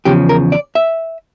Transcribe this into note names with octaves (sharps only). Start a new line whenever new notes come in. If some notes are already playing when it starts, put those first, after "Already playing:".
E2 C#3 F3 G4
A#4
D5
E5